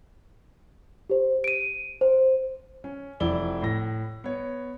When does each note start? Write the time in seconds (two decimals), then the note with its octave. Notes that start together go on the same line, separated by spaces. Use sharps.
1.10 G4 C5
1.44 D7 D#7
2.01 C5
2.84 C#4
3.20 F1 E4 D5 G7
3.62 A2 A#6
4.24 B3 C#5